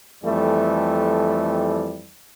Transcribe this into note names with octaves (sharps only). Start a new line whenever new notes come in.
F2 E3 G3 A3